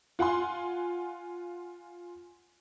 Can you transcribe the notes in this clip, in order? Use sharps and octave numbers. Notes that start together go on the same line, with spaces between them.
F4 F#5 G#5 C6